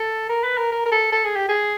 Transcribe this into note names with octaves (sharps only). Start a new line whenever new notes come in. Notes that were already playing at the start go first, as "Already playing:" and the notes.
Already playing: A4
A#4
B4
A#4
A#4
A#4
A4
A4
G#4
G4
G#4